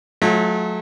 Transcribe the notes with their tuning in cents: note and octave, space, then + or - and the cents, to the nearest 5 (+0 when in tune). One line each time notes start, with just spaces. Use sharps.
F#3 -30 A3 -35 F4 +0